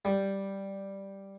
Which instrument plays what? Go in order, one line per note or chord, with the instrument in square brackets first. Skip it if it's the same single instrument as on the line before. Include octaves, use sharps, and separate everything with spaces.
[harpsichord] G3